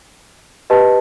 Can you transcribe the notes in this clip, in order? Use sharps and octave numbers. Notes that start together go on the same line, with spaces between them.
G4 B4 D#5 A5